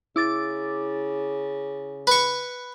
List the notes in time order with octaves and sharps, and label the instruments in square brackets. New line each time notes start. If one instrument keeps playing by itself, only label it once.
[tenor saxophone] C#3 [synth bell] E4 D6 A6
[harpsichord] B4 C#6